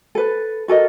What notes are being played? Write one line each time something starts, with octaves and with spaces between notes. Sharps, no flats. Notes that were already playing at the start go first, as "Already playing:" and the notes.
A4 B4
F#4 A4 A#4 D#5